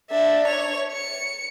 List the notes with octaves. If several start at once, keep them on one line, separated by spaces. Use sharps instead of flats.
D4 E5
C#5 F7
C#7